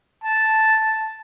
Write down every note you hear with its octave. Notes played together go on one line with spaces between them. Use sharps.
A5